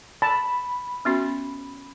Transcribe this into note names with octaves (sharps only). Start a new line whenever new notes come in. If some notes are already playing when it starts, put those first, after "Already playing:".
A5 B5
B3 C#4 F#4